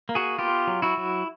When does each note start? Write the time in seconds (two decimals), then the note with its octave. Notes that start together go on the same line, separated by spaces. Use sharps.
0.09 A#3
0.15 F#4 G#4
0.38 B3 F4 G4
0.67 F#3
0.82 E4 F#4
0.97 F#3